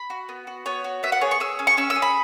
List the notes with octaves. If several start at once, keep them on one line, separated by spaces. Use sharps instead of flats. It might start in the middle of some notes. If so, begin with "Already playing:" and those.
Already playing: B5
F#4
B3
F#4
B3 C#5
F#4
B3 E5
F#5
G#4 C#5
C#6
G#4 E6
C#4
C#6
C#4 E6
E6
G#4
B5